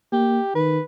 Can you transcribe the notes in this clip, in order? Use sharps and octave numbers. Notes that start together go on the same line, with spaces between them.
A#3 G4
D#3 B4